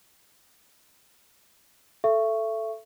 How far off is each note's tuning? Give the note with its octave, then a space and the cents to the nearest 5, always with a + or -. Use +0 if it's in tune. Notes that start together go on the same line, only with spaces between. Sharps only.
A4 +0 E5 +30 C#6 +0